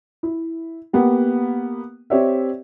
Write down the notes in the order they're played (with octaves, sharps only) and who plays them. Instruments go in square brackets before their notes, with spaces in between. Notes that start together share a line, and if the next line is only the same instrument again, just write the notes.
[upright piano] E4
A#3 B3 G4
C4 G4 C#5 D5 E5